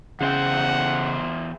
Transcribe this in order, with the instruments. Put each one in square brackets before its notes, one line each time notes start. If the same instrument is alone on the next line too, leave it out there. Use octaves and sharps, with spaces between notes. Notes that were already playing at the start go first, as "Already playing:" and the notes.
[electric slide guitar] E2 C5 G5 [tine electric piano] C#3 [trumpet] F#5